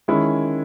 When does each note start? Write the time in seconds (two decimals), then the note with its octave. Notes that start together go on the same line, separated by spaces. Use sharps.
0.08 D#3 G#3 C#4 E4